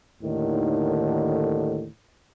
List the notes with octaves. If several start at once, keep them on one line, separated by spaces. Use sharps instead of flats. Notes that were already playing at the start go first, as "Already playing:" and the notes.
D#2 A2 D3 D#3